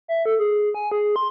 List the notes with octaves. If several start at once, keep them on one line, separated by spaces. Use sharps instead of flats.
E5
A4
G#4
G#5
G#4
C6